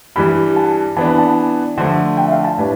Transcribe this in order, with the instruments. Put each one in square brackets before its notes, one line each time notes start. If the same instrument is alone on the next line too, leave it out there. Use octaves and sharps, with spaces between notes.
[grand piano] G2 E3 G3 [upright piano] B5
[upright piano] A5
[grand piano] E3 B3 D4 [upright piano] A5
[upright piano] B5
A5
[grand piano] D3 F3 A3
[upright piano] G5
E5
F5
A5
[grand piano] A2 G3 D4 [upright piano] B4